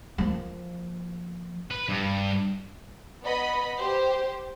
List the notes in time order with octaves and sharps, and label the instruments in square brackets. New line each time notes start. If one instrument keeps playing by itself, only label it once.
[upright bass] F3 A#3
[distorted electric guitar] B4
G2
[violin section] B3 D#5 B5
G4 C5